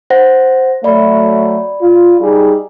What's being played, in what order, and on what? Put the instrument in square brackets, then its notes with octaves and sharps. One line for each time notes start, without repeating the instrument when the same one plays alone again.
[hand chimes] C5 F#5 A#6
[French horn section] F#3 A3 [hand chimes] D5 B5
[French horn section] F4
G3 D#4 G#4